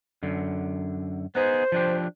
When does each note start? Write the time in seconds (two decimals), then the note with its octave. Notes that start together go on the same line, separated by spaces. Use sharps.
0.23 F#2 D3
1.35 B3 D#4 G#4 C5
1.72 F3 D4 G4